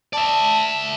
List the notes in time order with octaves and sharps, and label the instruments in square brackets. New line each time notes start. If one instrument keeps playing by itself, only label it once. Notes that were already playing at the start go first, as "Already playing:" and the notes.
[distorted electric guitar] D5 E5 [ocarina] A5